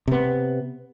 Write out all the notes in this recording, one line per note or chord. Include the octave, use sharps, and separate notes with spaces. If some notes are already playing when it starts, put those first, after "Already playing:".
C3 B3